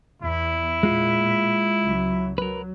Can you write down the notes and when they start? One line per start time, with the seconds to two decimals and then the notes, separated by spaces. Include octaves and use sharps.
0.22 E2 E4
0.83 A#2 G#3 F4
1.82 C#2 F#3
2.38 F#3 A#4 B4